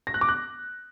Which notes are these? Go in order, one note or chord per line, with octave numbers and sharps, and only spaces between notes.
A#6
F#6
D6
F#6